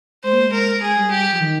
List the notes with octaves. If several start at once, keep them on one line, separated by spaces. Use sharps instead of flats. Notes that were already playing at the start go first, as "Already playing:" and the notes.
G#3 C5
A#3
G#3
A#4
G#3 G#4
G3
G4
F3
D#3